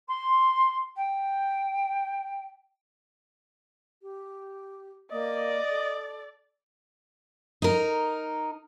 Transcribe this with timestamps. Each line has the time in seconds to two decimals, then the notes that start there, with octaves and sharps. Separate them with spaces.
0.08 C6
0.96 G5
4.02 G4
5.12 A#3 D5 D#5
5.70 A4
7.62 D#4 A#4